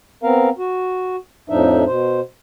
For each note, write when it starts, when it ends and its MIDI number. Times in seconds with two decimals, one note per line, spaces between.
0.23 0.49 59
0.23 0.49 60
0.23 0.49 70
0.23 0.49 77
0.58 1.16 66
1.49 1.84 41
1.49 1.84 45
1.49 1.84 53
1.49 1.84 62
1.49 1.84 63
1.49 1.84 76
1.87 2.20 47
1.87 2.20 72